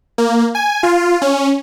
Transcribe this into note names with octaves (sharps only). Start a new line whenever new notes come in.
A#3
G#5
F4
C#4